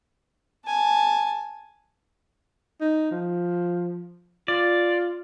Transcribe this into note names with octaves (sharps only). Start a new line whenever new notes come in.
G#5 A5
D#4
F3
F4 D5